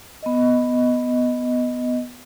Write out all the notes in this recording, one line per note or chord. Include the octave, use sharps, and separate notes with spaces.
B3 D#5